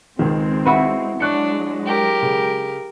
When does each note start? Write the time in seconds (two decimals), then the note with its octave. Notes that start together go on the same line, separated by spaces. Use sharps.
0.19 C#2 D#3 G#3 C4
0.65 E4 F#4 B4
1.20 F#3 G#3 D4 C#6 F#6 C#7
1.86 G4 A#4
2.23 C#3